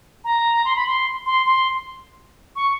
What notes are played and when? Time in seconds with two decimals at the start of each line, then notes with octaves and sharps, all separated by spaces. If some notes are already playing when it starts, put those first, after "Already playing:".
0.25 A#5
0.65 C6
0.76 B5
0.87 C6
1.26 C6
1.46 C6
2.56 C#6